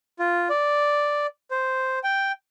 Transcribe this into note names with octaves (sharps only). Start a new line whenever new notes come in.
F4
D5
C5
G5